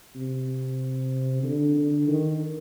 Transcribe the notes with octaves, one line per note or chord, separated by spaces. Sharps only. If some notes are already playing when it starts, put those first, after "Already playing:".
C3
D3
D3
D#3